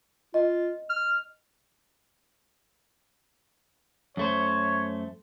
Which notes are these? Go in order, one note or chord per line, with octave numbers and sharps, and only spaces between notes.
F4 D#5
F6
F#2 A3 C5 C#5